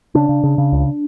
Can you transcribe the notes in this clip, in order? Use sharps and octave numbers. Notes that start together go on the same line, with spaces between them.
C#3 D4
C#3
C#3
C#3
C#2